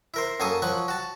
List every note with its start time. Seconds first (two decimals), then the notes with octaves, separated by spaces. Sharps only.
0.14 E4 A#4 C5
0.40 F#2 A#3 A4 G#5 C#6 D#6
0.62 F3 F#3 F#5 C#6
0.88 F#4 A5